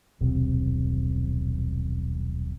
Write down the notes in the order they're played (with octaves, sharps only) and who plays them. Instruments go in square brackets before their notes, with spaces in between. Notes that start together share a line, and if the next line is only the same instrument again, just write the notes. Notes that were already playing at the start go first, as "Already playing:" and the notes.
[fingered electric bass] D#1 B1 C3